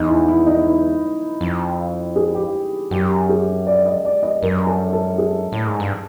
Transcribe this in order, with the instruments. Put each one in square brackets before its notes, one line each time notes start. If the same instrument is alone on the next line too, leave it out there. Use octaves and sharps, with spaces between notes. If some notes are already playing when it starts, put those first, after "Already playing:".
Already playing: [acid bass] E2 [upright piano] D#4
[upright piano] E4
E4
D#4
E4
[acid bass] F2
[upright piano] G#4
G4
[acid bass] F#2 [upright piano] G4
[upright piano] G#4
D5
D#5
D5
D#5
[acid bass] F#2 [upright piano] A#4
[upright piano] A4
A4
G#4
[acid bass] A2
G#2
G2